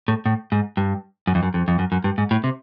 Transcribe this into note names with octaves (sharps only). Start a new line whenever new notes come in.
A2
A2
G#2
G2
F#2
F2
F#2
F2
F2
F#2
F#2
G2
G#2
A2
C3